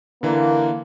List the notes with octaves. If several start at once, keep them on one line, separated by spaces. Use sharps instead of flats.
D3 E3 A#3